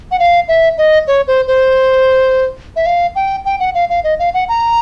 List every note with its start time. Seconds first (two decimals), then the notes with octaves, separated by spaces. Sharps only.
0.11 F#5
0.19 F5
0.48 E5
0.78 D#5
1.08 C#5
1.28 C5
1.47 C5
2.76 E5
2.86 F5
3.15 G5
3.45 G5
3.60 F#5
3.74 F5
3.90 F5
4.04 D#5
4.19 F5
4.34 F#5
4.49 A#5